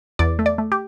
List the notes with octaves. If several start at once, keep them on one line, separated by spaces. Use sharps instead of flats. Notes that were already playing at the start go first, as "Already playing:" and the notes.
E2 D5
A3
D5
A3
G4